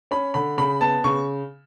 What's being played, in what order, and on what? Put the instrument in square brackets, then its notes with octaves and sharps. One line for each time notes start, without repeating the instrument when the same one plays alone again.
[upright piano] C#4 B5
D3 B5
C#3 B5
B3 A5
C#3 C#6